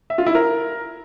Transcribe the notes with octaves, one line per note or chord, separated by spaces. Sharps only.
E5
F4
E4
A#4